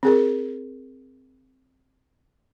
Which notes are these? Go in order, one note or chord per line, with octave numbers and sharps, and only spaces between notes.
C4 G#4 A#4